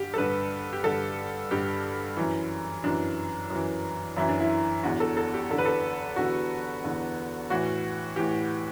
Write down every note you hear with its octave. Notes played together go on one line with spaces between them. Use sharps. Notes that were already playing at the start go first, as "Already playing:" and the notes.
Already playing: G2 D3 G4
A4
G2 D3 B4
G4
G2 D3 A4
G2 D3 G4
F#2 E3
F#2 E3 D4
F#2 E3
F#2 E3 E4
D4
E4
E2 D3 F#4
A4
A4
G4
E2 D3 A4
B4
A4
E2 D3 F#4
E2 D3
A2 E3 F#4
A2 E3 G4